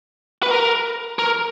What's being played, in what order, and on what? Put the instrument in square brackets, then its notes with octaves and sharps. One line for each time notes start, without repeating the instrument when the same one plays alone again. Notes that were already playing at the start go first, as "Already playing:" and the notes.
[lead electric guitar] B4
A#4
A#4